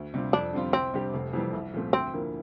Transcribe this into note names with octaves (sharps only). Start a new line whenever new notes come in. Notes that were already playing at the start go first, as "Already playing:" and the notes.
Already playing: D2
C3 G3 D4 F4
F2 D4
D3 G3 C4 F4
C2 C4
C3 G3 D4 G4
F1
F2 E3 G3
C2
A#2 F3 A3 C4
D2 C4
D3 F3 A#3 E4